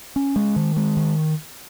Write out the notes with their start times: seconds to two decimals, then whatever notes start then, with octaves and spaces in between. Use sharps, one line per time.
0.16 C#4
0.36 G#3
0.56 D#3
0.77 G#3
0.97 D#3